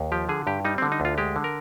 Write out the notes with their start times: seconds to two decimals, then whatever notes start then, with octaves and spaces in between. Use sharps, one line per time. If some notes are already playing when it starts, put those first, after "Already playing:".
Already playing: D#2
0.12 F3 G4
0.29 D3 G#4
0.47 G2 G4
0.65 G3 D#4
0.78 D3 C4
0.92 D#4
1.00 D2
1.05 F4
1.18 G#3 G4
1.36 D3
1.44 A#4